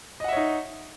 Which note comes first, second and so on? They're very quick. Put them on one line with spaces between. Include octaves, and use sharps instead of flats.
D#5 F#5 E5 C#5 D#4